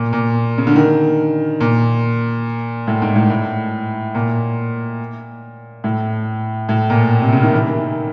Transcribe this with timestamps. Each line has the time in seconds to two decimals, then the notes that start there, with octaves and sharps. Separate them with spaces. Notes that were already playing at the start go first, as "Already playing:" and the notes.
Already playing: A#2
0.13 A#2
0.58 C#3
0.67 D3
0.76 D#3
1.60 A#2
2.87 A2
3.02 G#2
3.16 A2
3.30 A2
4.15 A#2
5.84 A2
6.69 A2
6.90 A#2
7.22 C3
7.33 C#3
7.43 D#3
7.54 E3
7.68 D#3